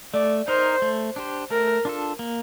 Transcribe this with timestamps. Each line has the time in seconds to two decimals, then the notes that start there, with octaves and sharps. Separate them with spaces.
0.14 A3 D5
0.48 D#4 A#4 C5
0.82 A3
1.16 D4 G4 C5
1.51 A3 A#4
1.85 D4 F4 A4
2.19 A#3